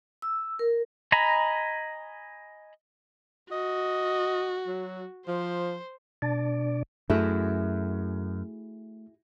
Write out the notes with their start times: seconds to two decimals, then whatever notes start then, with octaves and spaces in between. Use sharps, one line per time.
0.22 E6
0.59 A#4
1.12 D#5 G#5 A#5 B5
3.52 F#4 D#5
4.67 F#3
5.28 F3 C5
6.22 B2 D4 D5
7.10 F#2 A3 E4 F#4 G#4